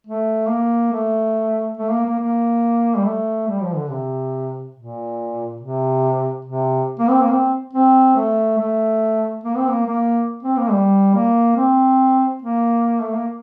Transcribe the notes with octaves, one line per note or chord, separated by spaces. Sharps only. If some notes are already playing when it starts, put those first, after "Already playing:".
A3
A#3
A3
A3
A#3
A#3
A#3
G3
A3
G3
F3
D3
C3
A#2
C3
C3
A#3
C4
A#3
C4
C4
A3
A3
A#3
C4
A#3
A#3
C4
A#3
G3
A#3
C4
A#3
A3
A#3